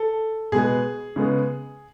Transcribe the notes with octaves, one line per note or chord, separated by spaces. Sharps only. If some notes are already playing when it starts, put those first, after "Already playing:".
Already playing: A4
B2 G#3 B3 G#4
C#3 G#3 B3